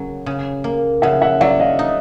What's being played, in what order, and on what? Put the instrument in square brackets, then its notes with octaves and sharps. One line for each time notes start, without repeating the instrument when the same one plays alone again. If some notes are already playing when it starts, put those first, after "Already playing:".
Already playing: [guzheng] C#3 F#3 A#3
C#3
A#3
[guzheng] C#3 [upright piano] E5 F#5
[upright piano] E5 F#5
[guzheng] F#3 [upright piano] D5 E5
[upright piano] D#5 F5
[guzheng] D#4